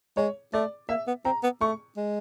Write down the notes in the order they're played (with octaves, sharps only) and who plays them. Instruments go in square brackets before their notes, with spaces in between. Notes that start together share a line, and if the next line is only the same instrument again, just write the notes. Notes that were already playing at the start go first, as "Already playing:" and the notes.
[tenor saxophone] G#3 [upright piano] C#5
[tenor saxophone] A3 [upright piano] D5
[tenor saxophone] A#3 [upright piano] E5
[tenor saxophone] B3
[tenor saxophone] C4 [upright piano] A#5
[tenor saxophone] B3
[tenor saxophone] A3 [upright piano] C#6
[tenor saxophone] G#3